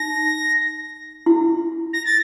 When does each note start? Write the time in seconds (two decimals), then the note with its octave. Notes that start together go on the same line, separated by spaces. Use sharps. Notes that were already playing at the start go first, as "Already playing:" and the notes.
Already playing: D#4 A#6
1.26 E4
1.93 A#6
2.06 A6